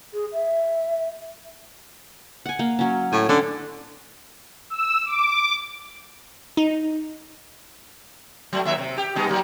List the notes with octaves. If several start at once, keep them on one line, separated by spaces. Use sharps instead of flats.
G#4
E5
F#5 G#5
A#3
F#3 C#4
A2 G#5
D3 C#4
E6
D6
D#4
F#3 A3
D#2 F#3 E5
C3
G4
G3 B3 D#4
F#3 A#3